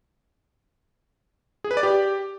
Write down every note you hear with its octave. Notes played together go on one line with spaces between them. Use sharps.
G#4
B4
D5
G4